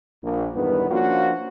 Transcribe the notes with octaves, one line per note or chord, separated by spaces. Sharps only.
A#1
B1 E2 G2 D#3 B3
F3 A#3 C#4 D4 F4 F#4